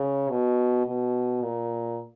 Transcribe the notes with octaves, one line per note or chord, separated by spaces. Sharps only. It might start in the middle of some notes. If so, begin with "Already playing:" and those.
Already playing: C#3
B2
B2
A#2